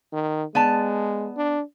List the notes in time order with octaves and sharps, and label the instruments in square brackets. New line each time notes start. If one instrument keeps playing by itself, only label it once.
[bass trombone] D#3
[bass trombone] G#3 [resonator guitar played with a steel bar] B3 D5 A5
[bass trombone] D4